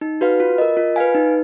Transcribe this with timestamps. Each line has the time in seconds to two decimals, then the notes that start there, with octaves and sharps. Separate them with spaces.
0.01 D#4
0.21 F#4 B4 F5
0.40 F4
0.58 A#4 D#5
0.77 F4
0.96 B4 F5 G#5
1.15 D#4